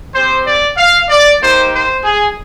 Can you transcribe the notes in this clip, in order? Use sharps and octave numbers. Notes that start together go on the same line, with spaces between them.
C4 G4 C5
D5
F5
D5
A#3 D#4 G4 C5
C5
G#4